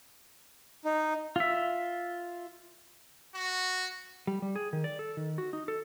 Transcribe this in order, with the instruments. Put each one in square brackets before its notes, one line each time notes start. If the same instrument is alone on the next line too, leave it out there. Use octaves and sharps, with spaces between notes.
[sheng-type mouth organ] D#4
[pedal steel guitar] F4 E5
[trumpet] F#4
[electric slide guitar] G3
G3
G#4
D#3
D5
A4
D#3
F#4
D#4
A4